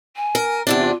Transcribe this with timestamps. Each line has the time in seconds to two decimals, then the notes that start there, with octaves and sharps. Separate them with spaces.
0.16 G#5
0.35 A#4
0.67 E2 C3 D4 E4
0.79 F4